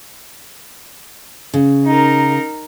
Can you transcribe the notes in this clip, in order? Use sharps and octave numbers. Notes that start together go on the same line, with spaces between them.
C#3
D#4 A#4